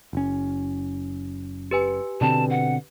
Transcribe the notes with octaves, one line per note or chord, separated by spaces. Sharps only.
F#1 C#4
G4 B4 G#5
B2 D3 C4 A5
F#5